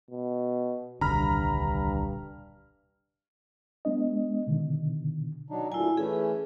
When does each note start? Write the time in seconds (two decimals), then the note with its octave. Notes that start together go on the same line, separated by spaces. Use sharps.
0.11 B2
1.01 D#1 C2 G2 D3 A#5 B5 F6
3.85 G#3 B3 D4 D#5
4.47 B2 D3 D#3
5.50 F#3 D4 D#4
5.72 D2 A#2 E4 G#5
5.97 E3 A3 C#4 G#4